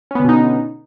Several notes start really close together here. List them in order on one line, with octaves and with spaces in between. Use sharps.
C#4 B3 D3 B2 D#4